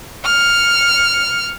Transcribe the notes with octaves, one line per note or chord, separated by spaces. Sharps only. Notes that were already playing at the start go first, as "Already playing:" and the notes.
F6 C#7